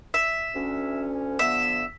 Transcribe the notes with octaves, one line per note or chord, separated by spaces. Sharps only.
E5
D2 C#4
D3 F3 B3 E5